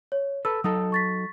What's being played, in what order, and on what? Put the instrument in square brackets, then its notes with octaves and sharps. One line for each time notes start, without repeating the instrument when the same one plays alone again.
[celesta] C#5
[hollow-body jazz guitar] A4 B4 [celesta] E6
[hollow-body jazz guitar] F#3 D#4 A4 [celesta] D#6 E6
[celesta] C#6 A6 B6